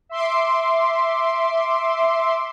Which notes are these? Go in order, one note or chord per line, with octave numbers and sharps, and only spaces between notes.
E5 C6 D6